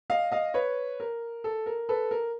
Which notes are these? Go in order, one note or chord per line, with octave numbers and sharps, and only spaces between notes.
D#5 F5
D#5 F5
B4 C#5
A#4
A4
A#4
A4 B4
A#4